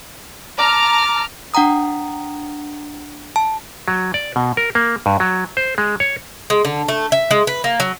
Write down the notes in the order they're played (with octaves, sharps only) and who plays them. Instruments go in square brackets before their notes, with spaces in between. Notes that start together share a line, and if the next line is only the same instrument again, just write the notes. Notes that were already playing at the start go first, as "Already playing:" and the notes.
[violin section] A5 A#5 F6 [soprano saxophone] D6
[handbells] D4 F#5 G5 A#5 D#6
A5
[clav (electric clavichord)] F#3
D5
B2
A#4
A#3
G2
F#3
C5
G#3
C#5
[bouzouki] G#3
D3
A3
E5
G#3
B4
A#3
F#3